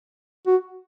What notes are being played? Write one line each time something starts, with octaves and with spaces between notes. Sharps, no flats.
F#4